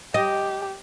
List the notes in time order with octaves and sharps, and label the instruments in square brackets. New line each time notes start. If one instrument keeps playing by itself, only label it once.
[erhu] G4 [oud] D#5